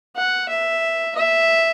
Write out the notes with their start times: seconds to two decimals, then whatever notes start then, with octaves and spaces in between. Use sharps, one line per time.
0.16 F#5
0.49 E5
1.16 E5